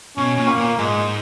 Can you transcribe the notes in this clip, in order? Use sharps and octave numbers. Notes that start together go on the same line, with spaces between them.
B2 C#4
A#2
A#3
A#2
G#2 G#3